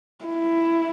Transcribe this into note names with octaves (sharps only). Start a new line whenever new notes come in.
E4